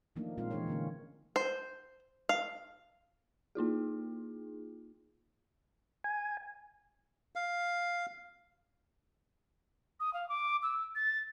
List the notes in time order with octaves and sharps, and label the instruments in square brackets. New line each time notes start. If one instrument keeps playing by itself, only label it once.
[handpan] D#3 F3 A3 A#3 D4 D#4
A#2 G#3 C4 D#4 F4 F5
E3 A#3 C#4 D#4 A#4 C#5
D3 A#3 C#4
[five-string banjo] C5
F5
[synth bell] A#3 D#4 F4 G#4
[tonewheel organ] G#5
[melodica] F5
[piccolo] D#6
F5
D6
E6
A6